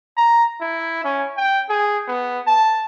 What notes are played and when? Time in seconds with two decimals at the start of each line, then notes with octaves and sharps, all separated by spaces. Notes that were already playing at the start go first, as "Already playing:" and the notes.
0.17 A#5
0.61 E4
1.05 C#4
1.37 G5
1.69 G#4
2.07 B3
2.47 A5